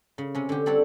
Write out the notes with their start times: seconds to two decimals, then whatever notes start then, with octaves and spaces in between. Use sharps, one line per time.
0.18 C#3
0.35 C3 C#4
0.49 D3 G4
0.66 G3 C4 A4 C#5 F#5